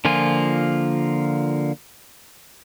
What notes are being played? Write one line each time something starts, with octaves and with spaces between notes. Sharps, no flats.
D3 F3 A#3 F4 G#5